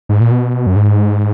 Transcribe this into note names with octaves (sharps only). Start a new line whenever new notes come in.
G#2
A#2
B2
F#2
G#2